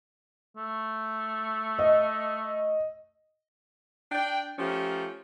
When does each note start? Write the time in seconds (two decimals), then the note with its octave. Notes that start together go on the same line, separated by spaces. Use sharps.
0.57 A3
1.79 D#5
4.12 D4 D5 G5
4.59 F3 A3 C#4 G4 A#4